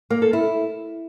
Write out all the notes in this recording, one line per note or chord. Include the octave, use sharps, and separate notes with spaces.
A#3
A4
E4